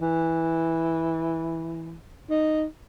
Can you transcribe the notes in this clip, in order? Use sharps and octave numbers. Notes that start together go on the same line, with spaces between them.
E3
D#4